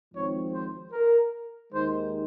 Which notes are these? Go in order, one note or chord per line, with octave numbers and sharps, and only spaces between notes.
G#1 G#2 F3 C4 C#5
C5
A#4
D#2 D#3 G#3 D#4 C5